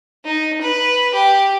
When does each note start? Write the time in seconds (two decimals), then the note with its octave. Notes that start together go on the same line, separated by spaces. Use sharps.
0.25 D#4
0.61 B4
1.14 G4